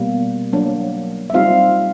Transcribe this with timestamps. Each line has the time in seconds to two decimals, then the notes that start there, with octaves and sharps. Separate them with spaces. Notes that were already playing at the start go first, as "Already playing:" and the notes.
Already playing: B2 G3 A#3
0.53 F#3 A#3 D4
1.30 E5
1.34 G3 C4 D#4 F4 F5